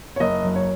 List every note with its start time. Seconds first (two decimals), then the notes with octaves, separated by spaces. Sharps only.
0.16 C#5
0.20 F#1 D#5
0.44 F#2
0.55 C#5